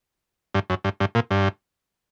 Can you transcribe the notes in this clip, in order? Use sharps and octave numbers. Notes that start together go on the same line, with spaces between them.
G2
F#2
G2
G2
A#2
G2